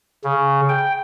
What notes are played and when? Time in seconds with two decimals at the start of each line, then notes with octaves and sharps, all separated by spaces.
0.24 C#3
0.69 G5